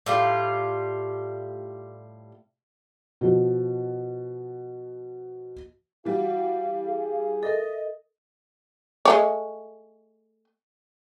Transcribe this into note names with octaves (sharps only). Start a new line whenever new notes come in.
A2 G3 F4
B2 F3
E3 G3 F#4 F5
G#4
A4 A#4 D#5 E5
G#3 A3 C#5